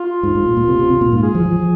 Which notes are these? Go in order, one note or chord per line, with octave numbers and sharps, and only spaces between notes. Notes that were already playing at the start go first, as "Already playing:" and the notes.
Already playing: F4
G#2
G#2
A#2
A#2
C3
C3
C3
A#2
G#2 F4
G#4
F3
F3
F3